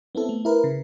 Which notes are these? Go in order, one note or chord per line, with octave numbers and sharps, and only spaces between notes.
B3 C4 E4 A4
A3
E4 A#4 B4
C#3